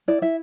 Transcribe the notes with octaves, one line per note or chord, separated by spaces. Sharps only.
E4 D5
E4 E5